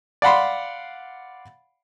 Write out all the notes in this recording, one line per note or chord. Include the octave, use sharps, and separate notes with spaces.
D5 F5 F#5 B5 C6